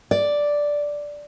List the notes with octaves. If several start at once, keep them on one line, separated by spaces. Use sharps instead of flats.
D5